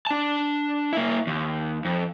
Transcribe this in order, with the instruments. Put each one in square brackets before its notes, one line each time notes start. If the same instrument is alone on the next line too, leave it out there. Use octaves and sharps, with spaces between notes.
[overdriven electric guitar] D4 A5
A#3 E4
D#2
F2